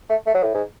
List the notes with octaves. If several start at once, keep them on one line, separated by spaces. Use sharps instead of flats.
A3
A3
F#3
A2
G#2